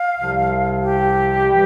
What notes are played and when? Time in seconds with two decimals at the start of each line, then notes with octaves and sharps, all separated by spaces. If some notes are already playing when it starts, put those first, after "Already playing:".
Already playing: F5
0.17 C2 C3 F3
0.84 G4
1.49 E3 G3